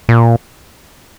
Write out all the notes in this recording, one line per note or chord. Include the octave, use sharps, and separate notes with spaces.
A#2